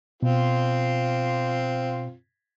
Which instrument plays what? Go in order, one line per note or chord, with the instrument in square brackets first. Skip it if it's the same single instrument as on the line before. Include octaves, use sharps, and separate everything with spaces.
[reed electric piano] B2 [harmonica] C4 F4